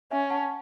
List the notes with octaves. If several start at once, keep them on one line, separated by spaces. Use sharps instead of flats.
C#4 E5 G#5
F#5 A5